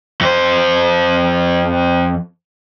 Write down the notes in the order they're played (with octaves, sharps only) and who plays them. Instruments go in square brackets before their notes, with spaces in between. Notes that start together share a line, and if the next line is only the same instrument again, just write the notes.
[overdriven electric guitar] F2 C5